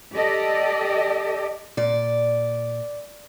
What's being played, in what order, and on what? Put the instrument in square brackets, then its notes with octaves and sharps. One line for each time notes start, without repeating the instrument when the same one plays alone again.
[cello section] G4 A4 D5 D#5
[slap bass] A#2 [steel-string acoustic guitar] D5